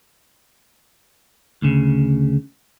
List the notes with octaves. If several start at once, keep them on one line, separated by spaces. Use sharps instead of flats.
D2 C#3